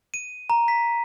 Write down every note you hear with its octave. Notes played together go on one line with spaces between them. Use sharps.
D#7
A#5
B6